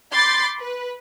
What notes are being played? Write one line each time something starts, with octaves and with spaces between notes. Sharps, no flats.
B5 C6 D6 G6 A6 C7
B4